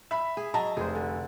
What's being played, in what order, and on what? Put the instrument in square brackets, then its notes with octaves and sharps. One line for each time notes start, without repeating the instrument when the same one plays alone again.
[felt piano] E5 B5
[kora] G#4
[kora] F#3 E5 [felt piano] D#5 A5 A#5
[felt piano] F1 [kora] G#4 C5
[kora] D3